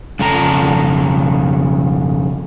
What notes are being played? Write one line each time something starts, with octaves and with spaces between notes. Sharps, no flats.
F2 C#3 A4 A5 A#5